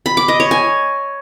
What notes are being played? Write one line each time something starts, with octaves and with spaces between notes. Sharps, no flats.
B5
D6
D#5
C#5
G#5